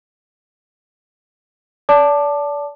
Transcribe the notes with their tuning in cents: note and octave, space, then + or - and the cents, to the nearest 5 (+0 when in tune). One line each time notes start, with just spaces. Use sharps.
D5 -30 A5 +0 D6 +20